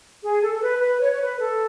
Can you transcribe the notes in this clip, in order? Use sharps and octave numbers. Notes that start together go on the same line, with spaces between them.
G#4
A4
A4
B4
B4
C#5
C#5
B4
A4